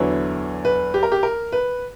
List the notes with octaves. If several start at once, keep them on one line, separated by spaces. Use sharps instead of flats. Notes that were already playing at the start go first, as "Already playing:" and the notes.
Already playing: E2 D3 F#3 B3 E4 C#5
B4
G4
A#4
G4
A#4
B4